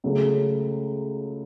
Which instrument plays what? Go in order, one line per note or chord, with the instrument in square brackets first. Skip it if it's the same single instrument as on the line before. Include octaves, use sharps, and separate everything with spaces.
[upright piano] C#2 C#3 F#3 A3